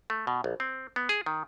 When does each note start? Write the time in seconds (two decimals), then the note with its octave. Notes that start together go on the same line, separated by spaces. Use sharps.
0.10 A3
0.27 B2
0.44 A#1
0.60 C4
0.96 B3
1.09 G#4
1.26 D#3